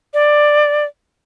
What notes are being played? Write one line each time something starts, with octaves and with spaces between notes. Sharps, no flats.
D5